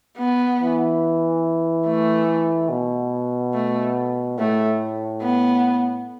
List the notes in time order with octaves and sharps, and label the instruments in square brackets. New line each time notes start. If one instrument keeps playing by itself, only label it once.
[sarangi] B3
[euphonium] E3
[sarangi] A3
[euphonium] B2
[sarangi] A3
[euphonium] A2 [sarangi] A3
[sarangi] B3